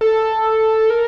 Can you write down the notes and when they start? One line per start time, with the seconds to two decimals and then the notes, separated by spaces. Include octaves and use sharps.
0.01 A4
0.90 A#4